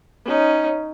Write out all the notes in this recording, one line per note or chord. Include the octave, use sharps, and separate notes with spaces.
C#4 D#4